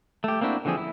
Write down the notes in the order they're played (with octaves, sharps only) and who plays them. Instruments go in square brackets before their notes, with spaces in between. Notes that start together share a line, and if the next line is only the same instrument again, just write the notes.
[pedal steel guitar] A3 G4
A#3 C4 D4 E4 F#4
D3 E3 F3 C4 G#4
E4